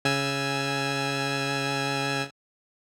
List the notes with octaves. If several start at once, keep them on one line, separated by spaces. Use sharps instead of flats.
C#3 G#5 E6